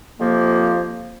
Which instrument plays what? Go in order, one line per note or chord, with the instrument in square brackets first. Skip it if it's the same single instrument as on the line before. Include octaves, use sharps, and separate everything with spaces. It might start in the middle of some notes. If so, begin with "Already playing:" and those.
[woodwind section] F2 C3 F3 A#3